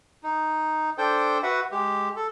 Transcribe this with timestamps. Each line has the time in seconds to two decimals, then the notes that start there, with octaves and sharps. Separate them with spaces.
0.23 D#4
0.98 D4 A4 C5 G5
1.43 F#4 B4 E5 F#5
1.72 G#3 G4
2.16 A4